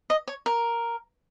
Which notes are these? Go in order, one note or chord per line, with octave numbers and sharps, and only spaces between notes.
D#5
C#5
A#4